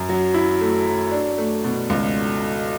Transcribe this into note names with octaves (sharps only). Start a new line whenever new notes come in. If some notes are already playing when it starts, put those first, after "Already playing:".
Already playing: F#2
F#3
E4
A3
F#3
D4
A3
B2
C#2